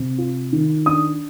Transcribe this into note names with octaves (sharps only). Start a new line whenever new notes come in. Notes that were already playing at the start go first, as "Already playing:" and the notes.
Already playing: C3
F4
D#3
D4 D#6